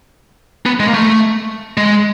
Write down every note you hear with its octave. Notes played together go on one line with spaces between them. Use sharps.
B3
G#3
A#3
A3
G#3